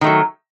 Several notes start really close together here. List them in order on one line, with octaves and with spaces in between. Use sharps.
D#3 A3 F#3